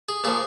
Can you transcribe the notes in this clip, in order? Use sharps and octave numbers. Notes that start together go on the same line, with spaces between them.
G#4
A#2 F3 G#4